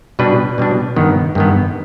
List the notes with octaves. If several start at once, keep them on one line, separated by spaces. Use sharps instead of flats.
B2 G3 D4 B4
B2 G3 D4
G2 D#3 B3
G2 D#3 B3